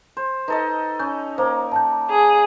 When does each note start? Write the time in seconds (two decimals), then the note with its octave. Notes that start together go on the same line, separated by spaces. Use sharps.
0.17 C5
0.48 D#4 A4 B4 D#5
0.99 C#4 G6
1.38 A#3 C5 A#5
1.72 A5 A#5 G6
2.09 G#4